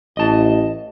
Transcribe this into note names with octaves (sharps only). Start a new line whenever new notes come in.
A1 D#5 A5